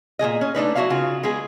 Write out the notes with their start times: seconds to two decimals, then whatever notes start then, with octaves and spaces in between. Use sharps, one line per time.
0.19 A#2 G#3 G#4 D#5
0.41 C#4
0.55 A3 D4 D#4 B4
0.75 F#3 E4 F#4 C#5 E5 F5
0.90 C#3 F4 F#4
1.23 G#3 B3 G#4